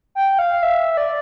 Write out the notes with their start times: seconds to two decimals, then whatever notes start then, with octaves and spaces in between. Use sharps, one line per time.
0.15 G5
0.39 F5
0.63 E5
0.93 E5
0.97 D5